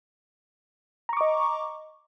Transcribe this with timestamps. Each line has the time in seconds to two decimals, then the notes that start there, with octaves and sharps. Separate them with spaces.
1.09 A#5
1.13 C#6
1.17 D6
1.21 D#5